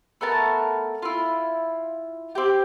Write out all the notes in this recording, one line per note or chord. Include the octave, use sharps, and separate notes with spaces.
A3 B3 A#4 A5
E4 F4
C4 G4